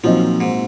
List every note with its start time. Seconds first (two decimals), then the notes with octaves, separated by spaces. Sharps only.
0.03 A#2 F3 F#3 C4 D#4
0.41 G#2